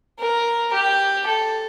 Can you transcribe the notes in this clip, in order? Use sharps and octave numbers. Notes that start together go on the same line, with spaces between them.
A#4
G4
A4